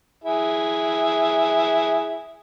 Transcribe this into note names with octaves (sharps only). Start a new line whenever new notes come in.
E4 G#4